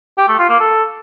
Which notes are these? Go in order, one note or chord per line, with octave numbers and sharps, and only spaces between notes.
G4
A3
F4
A#3
A4